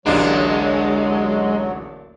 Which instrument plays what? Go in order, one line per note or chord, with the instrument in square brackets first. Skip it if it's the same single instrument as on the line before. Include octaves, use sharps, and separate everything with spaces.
[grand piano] D1 A1 [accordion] F#3 [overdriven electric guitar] G#3 [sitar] A#3 D4